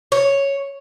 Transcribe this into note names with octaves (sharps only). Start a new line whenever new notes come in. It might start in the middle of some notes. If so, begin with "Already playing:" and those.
C#5